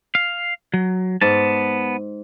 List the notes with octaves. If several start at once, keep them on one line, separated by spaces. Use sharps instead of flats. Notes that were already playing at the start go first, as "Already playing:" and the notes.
F5
F#3
G#2 B3 A5